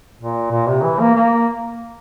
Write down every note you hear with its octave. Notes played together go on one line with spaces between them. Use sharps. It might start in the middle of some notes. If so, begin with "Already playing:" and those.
A#2
A#2
C3
E3
A#3
A#3